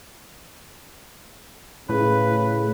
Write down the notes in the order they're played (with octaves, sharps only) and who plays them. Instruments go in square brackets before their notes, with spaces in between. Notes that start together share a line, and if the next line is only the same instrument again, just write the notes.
[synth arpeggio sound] A2 [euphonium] C#3 [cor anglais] B4